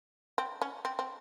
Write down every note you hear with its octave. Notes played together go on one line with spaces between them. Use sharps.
C4
C#4
C4
C4